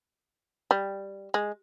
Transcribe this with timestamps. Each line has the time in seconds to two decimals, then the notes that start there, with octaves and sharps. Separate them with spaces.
0.71 G3
1.34 G#3